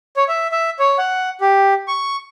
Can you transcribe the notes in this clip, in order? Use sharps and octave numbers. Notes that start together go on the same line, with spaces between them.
C#5
E5
E5
C#5
F#5
G4
C#6